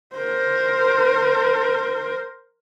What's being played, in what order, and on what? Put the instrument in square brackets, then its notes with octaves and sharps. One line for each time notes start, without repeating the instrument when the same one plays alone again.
[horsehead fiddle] A#4 C5